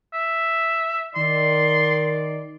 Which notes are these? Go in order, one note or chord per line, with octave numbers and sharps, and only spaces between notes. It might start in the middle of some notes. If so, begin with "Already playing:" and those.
E5
D#3 D5 C6